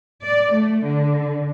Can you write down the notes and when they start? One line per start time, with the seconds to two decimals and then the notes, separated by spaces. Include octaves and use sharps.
0.22 D5
0.54 A3
0.85 D3